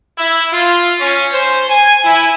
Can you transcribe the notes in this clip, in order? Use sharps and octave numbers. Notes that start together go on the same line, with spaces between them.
E4
F4
C#4
C5
G#5
E4